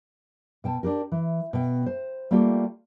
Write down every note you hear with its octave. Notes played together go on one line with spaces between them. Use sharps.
B2 G5 A5
D4 D#4 G4 A#4
E3
B2 G5
C5
G3 A3 A#3 F4 G4